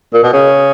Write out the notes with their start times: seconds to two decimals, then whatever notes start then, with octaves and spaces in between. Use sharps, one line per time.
0.14 A#2
0.24 B2
0.33 C#3